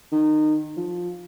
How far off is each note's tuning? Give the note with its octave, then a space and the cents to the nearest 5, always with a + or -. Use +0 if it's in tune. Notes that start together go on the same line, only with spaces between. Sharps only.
D#3 -25
F3 +15